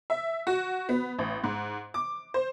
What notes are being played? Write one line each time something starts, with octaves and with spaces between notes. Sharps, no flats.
E5
F#4
B3
A1
G#2
D6
C5